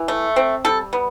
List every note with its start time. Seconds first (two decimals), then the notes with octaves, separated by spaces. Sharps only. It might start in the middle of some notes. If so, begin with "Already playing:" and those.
Already playing: E3
0.08 A3
0.36 C4
0.64 G3 A4
0.93 B3